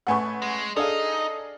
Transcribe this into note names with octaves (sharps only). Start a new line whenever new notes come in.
A1 A3 B4 F#5 G#5 C#6
G#3
D4 D#4 G#4 A4 D#5 F5